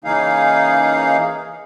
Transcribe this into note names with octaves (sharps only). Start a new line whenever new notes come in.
C#3 E3 A#3 D#4 G#4 F5